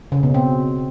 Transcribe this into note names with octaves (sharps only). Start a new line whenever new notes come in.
C#3
B2
C4